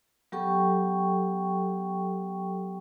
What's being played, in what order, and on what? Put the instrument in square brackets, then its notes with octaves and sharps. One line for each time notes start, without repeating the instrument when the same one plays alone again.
[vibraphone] F#3 B3 G4 A4 G5 C#6